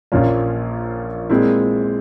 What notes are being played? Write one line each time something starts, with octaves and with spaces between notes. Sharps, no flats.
A#1 A#2 F3 A#3 C#4
A#2 G#3 C4 E4